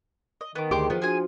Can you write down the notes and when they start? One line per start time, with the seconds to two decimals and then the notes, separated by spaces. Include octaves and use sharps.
0.41 D#5
0.55 D#3 B3 D6
0.71 D2 G4 G#4 C5 G5 C6 D6
0.90 F3 B3
1.02 D4 F#4 G#4 G#5 C6